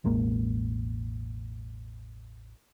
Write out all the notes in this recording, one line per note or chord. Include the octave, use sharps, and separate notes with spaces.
E1 A1 G#3 A#3